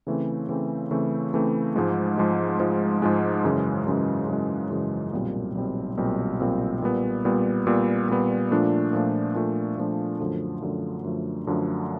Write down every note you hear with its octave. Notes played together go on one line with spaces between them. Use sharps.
C#3 E3 A3 C4
C#3 E3 A3 C4
C#3 E3 A3 C4
C#3 E3 A3 C4
G#2 F3 G#3
G#2 F3 G#3
G#2 F3 G#3
G#2 F3 G#3
F#2 C#3 E3 G#3
F#2 C#3 E3 G#3
F#2 C#3 E3 G#3
F#2 C#3 E3 G#3
B1 A#2 G3 C4
B1 A#2 G3 C4
B1 A#2 G3 C4
B1 A#2 G3 C4
A#2 G3 B3
A#2 G3 B3
A#2 G3 B3
A#2 G3 B3
A#2 F3 A3 D4
A#2 F3 A3 D4
A#2 F3 A3 D4
A#2 F3 A3 D4
F#2 D3 F3 A3
F#2 D3 F3 A3
F#2 D3 F3 A3
F#2 D3 F3 A3